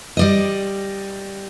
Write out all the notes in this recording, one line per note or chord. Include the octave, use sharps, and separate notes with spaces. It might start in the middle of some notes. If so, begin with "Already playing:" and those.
G3 D5 D#5